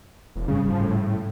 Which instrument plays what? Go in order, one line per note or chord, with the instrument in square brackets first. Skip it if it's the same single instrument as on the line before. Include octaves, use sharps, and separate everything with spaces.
[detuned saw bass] E1
[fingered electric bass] G#2 G3 C#4 [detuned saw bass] C#3
[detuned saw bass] F3
A2